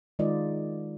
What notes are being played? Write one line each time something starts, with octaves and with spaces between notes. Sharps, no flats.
D#3 G#3 D#4 F4 D5 D#5